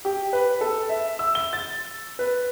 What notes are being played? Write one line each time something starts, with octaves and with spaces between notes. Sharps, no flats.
G4
B4
A4
E5
E6
G7
A6
B4